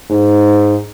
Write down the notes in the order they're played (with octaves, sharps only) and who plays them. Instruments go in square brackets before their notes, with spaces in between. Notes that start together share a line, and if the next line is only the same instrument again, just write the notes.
[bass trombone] G#2